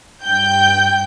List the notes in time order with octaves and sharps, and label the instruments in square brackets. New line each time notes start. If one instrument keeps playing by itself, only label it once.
[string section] G2 G5 G6